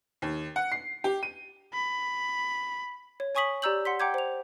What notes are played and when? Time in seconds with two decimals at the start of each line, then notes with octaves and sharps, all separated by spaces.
0.22 D#2
0.56 F#5
0.72 C7
1.04 G4
1.23 D#7
1.74 B5
3.20 C#5
3.35 C#5 G#5 C#6 D#6 B6 F#7
3.62 G4 D5 A#5 E6 G6 F#7
3.85 F#5 C6 B6
4.00 F#5 G5 A#5 D6 G6 G#6
4.14 C5 F7